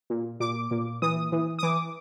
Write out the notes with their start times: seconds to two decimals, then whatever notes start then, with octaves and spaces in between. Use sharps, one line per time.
0.10 A#2
0.40 A#2 D6
0.71 A#2
1.02 E3 D#6
1.32 E3
1.59 D#6
1.63 E3 D6